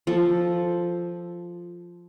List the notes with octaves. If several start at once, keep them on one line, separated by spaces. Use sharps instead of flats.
F3 A4